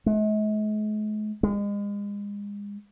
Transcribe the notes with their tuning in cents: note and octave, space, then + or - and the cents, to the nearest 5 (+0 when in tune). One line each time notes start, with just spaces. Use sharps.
G#3 +45
G#3 -35